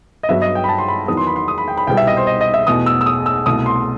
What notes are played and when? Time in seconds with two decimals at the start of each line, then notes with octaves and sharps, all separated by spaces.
0.23 D#5
0.29 G2 F#3 B3 E5
0.42 D#5
0.55 G5
0.64 B5
0.69 A5
0.78 C6
0.88 B5
1.08 E2 D#3 F#3 B3 D#6
1.17 C6
1.27 B5
1.36 C6
1.48 D#6
1.58 B5
1.68 G5
1.77 B5
1.87 C2 B2 G3 B3 G5
1.97 E5
2.07 D#5
2.17 C5
2.27 D#5
2.41 D#5
2.54 E5
2.67 E2 B2 A3 D#6
2.86 E6
3.01 E6
3.06 D#6
3.26 E6
3.46 C2 B2 A3 D#6
3.66 C6